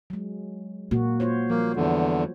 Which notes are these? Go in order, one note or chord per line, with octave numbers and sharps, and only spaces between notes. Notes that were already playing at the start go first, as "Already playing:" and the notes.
F#3 G#3
A#2 A#3 F#4
F4 C5 C#5
F3 G3 A#3
E2 D3